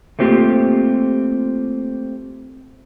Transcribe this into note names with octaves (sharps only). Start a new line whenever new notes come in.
A3 A#3 C4 F4 G4